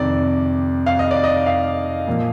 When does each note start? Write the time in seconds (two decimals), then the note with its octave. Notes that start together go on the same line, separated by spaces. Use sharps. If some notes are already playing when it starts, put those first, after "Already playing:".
Already playing: F2 C3 D#3 D5
0.86 F5
0.99 D#5
1.11 D5
1.24 D#5
1.46 F5
2.07 A#2 F3 A#3